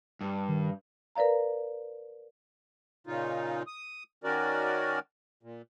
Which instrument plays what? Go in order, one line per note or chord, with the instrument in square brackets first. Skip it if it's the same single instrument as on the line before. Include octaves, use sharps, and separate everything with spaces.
[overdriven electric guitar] G2
[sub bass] D#3
[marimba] A#4 B4 D5 F5 A#5
[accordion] A#2 C#3 D#4 F4
D#6
D#3 C#4 F#4 A#4 D5
A#2